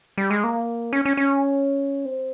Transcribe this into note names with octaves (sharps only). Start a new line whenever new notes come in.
G3
G#3
A#3
C#4
C#4
C#4
C4